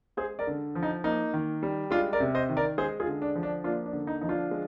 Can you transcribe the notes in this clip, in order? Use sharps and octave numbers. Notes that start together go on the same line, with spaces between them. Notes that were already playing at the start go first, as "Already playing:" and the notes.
G#3 G#4 C5
A#4 D5
D3
F3
D#4
A#3 D#4
D#3
G3
G#3 D4 F4
A#4 D5
C3
C5 D#5
D#3
A#4 D5
G#3 G#4 C5
F4 G#4
D3
D4
F3
D4
A#3 D4 F4
D4
D3
D#4
F3 D#4
D4 F4
G#3